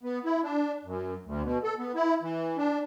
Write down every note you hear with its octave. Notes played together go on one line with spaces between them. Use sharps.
B3
E4
D4
F#2
D2
B2
A4
B3
E4
E3
D4